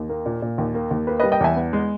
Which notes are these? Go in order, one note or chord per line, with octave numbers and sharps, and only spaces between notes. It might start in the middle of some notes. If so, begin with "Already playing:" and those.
Already playing: D#2
A#3
A#2
A#2
D#2
A#3
D#2
A#3 B4
G3 B4 D#5
D#5 G5
E2 E5 G#5
B3
G#3